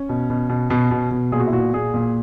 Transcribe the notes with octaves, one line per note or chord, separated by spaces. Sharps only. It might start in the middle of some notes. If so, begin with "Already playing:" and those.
Already playing: C#4
B2
B2
B2
B2
B2
B2
A#2 G#4
F#4
E4
A#2 F#4
A#2 G#4
A#2